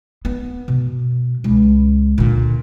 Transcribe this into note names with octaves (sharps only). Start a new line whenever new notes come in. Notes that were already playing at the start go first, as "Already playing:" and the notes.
B3
B2
C#2
A#2 D3